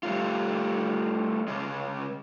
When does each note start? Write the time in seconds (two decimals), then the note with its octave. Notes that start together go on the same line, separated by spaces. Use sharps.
0.03 G3 A3 F4
1.48 C#3 G#3